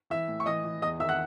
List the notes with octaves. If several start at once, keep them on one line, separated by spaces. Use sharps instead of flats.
E3 E5 E6
A2
C#6
E3 D#5 D#6
E3
E2 D#5 D#6
D#3 E5 E6
F#5 F#6